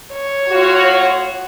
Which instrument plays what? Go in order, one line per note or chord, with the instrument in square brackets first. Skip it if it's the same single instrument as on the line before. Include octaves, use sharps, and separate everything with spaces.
[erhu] C#5
[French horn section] A2 F4 F#4